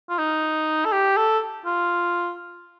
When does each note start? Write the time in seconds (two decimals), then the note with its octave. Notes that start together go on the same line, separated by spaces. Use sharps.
0.09 F4
0.18 D#4
0.85 A4
0.92 G4
1.17 A4
1.65 F4